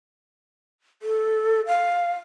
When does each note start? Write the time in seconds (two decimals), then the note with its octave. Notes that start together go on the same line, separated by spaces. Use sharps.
1.02 A4
1.67 F5